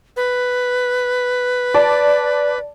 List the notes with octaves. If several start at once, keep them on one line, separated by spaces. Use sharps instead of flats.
B4
D5 A5